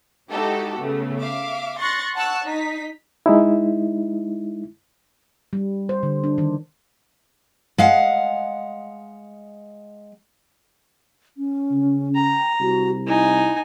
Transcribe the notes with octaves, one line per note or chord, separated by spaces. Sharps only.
G#3 D#4 E4 F#4 G4 A4
C#3 A3 B3
E5 F5 D6
C6 C#6 F#6 A6 A#6
F#5 A5 C#6 E6 F#6
D#4 B6
G#3 D#4 E4
G3
C5
D3
D4
D#3
G#3 F5 F#5
C#4
C#3
G5 A#5
C2 F#4
D#4 E4 G#5